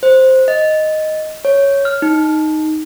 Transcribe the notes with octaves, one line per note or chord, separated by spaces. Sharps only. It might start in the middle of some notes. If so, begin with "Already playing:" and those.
C5
D#5
C#5
F6
D#4